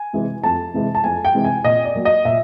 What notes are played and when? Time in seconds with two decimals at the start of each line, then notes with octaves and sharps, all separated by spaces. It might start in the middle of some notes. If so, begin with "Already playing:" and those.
Already playing: G#5
0.13 C3 E3 G#3
0.44 F2 A5
0.74 C3 E3 G#3
0.95 A5
1.04 F2 G#5
1.25 G5
1.35 C3 E3 G#3
1.45 G#5
1.64 A#2 D#5
1.85 D5
1.95 F#3 A#3
2.05 D#5
2.25 A#2 E5